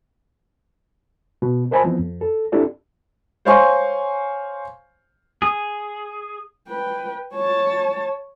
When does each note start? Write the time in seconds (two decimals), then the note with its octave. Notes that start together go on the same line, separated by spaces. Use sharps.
1.42 B2
1.71 A#4 C5 D#5 G#5 A5 B5
1.84 E3 F3 B3 C4
1.99 F2
2.21 A4
2.52 C4 D4 E4 G4 A4 D5
3.45 C5 C#5 F5 G#5 C6 C#6
5.42 G#4
6.68 B4 G5
7.34 C#5 A5